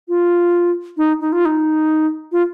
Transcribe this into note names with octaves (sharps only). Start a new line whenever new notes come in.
F4
D#4
D#4
F4
D#4
F4